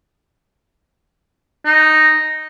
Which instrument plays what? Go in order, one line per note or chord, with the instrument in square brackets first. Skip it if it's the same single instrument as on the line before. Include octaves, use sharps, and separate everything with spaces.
[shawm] D#4